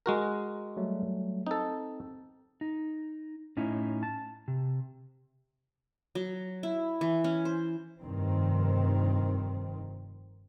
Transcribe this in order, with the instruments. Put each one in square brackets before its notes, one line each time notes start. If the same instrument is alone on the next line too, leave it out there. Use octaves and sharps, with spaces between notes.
[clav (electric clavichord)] G#3 F#4 A#4
[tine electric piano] F#3 G3 A3
[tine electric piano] C4 [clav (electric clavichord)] D#4 A4
[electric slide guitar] D#4
A2 C#4 D#4 E4
A5
C3
[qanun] F#3
E4
E3
C#4
C5
[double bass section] F1 G2 D#3 C4